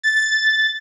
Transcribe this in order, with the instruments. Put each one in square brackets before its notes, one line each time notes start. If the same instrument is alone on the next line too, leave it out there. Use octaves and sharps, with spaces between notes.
[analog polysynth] A6